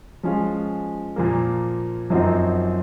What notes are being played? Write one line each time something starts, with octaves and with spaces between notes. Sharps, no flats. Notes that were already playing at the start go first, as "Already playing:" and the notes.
F3 G#3 C#4 F4
A#2 F3 A#3
F#2 F3 C4 D#4 F#4